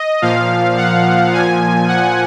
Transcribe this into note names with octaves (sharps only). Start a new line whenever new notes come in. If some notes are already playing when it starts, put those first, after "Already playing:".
Already playing: D#5
A#2 F3 F5
F#5
A#2 F3 G#5
F#5